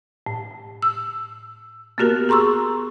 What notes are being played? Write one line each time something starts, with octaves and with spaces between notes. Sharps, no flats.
A2
E6
A#3 B3 F#4 G4 A#4
G#4 A#5 C6 C#6 E6